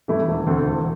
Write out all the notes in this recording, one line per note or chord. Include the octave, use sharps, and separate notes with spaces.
G2 E3 A3 E4
E1
D2 D3 C4 A4
E1